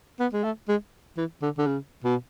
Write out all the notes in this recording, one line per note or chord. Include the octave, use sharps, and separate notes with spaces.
B3
G#3
A3
G#3
E3
D3
D3
C#3
B2